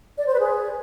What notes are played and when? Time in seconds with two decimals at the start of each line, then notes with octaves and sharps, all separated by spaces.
0.18 D5
0.26 C5
0.33 B4
0.40 G#4